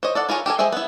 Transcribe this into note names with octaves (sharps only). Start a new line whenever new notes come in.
C5 C#5 D#5
A4 D5 F#5
E4 F4 G#4 A#4 C#5
G4 A4 A#4 G#5
G#3 G#4 C5 E5 G5
B3 E4